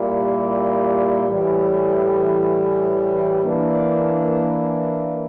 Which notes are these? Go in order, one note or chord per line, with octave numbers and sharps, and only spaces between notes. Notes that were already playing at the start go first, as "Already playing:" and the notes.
Already playing: A#2 G3 A#3 E4 G4
A2 E3 G3
E3 A#3 D4